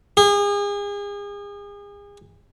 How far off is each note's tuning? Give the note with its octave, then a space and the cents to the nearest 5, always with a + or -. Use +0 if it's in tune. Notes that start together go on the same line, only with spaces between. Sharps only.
G#4 -35